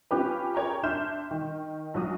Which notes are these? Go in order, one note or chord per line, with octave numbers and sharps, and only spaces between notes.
C#4 F4 G4 B4
G#4 A#4 C#5 G5 A#5
D4 E5 C6 F6 G6 E7
D#3
A#1 F#3 D#6